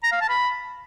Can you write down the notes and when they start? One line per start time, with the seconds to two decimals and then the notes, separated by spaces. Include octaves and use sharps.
0.04 A#5
0.12 F5
0.21 A5
0.29 B5